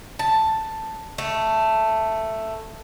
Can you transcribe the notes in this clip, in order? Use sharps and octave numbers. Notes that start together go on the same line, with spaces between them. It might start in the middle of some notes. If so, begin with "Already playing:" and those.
A5
A3